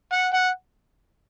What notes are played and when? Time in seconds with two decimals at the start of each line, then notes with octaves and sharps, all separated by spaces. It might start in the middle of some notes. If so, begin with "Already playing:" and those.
0.12 F#5
0.34 F#5